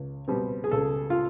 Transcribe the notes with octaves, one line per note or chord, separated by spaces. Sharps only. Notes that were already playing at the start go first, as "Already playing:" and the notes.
Already playing: C#2
B2 G3 C4
G#4
C#2 A4
F4